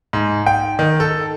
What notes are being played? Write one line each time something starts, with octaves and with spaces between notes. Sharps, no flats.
G#2
G5
D#3
A4